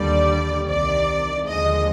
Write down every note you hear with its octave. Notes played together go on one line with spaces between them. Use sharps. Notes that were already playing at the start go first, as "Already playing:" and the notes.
Already playing: D#2 D3 G3 D5
C2 C3 D#3 D5
D#2 D3 F3 G#3 D#5